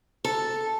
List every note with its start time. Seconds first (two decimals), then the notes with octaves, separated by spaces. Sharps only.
0.24 A4